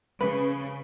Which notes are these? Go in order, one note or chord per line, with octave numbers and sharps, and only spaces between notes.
C#3 B4